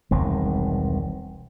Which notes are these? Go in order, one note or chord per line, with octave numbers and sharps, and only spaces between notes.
E1 C2 D#3